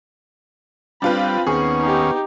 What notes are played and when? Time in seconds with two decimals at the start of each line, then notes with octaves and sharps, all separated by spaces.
1.02 G3 C4 D4 F4 B4 B5
1.47 D#2 B3 C#4 G#4
1.80 D#4 G4